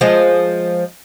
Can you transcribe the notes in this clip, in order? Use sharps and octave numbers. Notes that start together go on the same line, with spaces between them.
F3 G#3